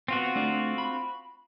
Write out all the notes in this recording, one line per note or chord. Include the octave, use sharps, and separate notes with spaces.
B3 C4 F4 F#4
A3 D4 D5
B5